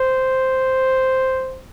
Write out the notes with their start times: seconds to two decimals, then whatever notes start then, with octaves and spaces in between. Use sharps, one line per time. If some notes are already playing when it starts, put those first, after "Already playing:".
Already playing: C5